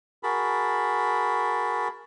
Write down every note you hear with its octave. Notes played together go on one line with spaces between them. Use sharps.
F#4 G#4 A#4 A5 B5